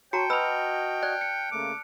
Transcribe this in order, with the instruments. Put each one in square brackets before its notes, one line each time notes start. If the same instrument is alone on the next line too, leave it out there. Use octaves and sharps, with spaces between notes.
[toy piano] F#4 A#5 [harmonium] C#5 [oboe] G5 [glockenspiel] A5 C#7
[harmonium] F#4 D#5 [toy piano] B4 B5 E6 [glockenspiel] F6 F7
[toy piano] D5 [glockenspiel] F#6
[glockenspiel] C#7
[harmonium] C#3 A3 A#3 [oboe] D6